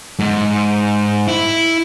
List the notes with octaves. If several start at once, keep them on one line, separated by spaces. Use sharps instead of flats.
G#2
E4